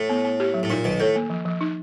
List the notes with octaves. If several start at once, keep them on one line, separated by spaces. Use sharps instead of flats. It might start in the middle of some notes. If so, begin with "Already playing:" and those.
Already playing: A2
B3
B3
G4
F#3
A2
A#2 D#4
B1 B2 D#3
A2 A4
A#3
F3
F3
D#4